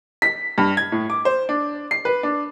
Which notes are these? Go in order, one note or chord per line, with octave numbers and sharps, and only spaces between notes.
B6
G2
G#6
A2
D6
C5
D4
C7
B4
D4